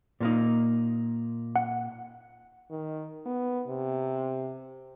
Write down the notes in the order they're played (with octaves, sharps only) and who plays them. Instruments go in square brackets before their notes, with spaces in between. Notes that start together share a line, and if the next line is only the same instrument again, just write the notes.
[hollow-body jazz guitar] A#2 A#3 D#4
[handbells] F#5
[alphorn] D#3
B3
C3